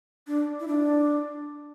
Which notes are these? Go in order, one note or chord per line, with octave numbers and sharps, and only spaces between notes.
D4
E4
D4